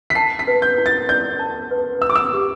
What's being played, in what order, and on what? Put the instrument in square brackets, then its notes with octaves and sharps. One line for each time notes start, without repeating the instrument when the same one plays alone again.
[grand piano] B6
[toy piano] A5 [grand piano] C7
[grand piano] B6
[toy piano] B4
[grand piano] G6
[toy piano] E4
[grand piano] A6
[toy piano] D5 [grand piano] G6
[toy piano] A5
B4
[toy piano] E5 [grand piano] E6
[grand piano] D6
E6
[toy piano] G4